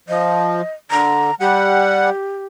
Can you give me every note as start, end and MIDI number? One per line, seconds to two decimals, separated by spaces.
0.08 0.62 53
0.08 0.72 75
0.90 1.31 50
0.90 1.35 82
1.40 2.10 55
1.40 2.46 67
1.40 2.10 78